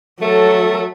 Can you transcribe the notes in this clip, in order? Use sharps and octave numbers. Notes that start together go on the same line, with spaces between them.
F#3 A3 A4